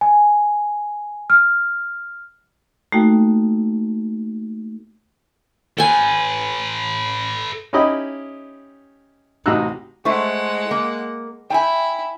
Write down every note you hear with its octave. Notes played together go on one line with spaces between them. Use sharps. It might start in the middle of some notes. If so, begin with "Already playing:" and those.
G#5
F6
A3 A#3 D#4 F#4 A4 G5
A4 B4 G5 G#5
C#4 D#4 E4 G4 D#5 B5
A1 C3 D#4 F#4 E6 F#6
G#3 A3 E4 C5 F#5
A#3
E4 G5 G#5